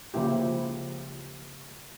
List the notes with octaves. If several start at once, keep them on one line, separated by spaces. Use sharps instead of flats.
C#3 F3 A#3 E4 G4